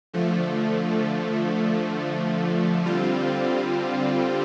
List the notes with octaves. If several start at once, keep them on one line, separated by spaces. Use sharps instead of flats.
D3 F3 A3
D3 G3 C4 F4